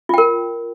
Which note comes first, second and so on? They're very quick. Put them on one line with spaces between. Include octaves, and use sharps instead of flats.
F4 G5 A#4